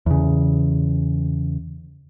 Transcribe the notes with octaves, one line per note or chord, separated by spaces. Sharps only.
E2 C#3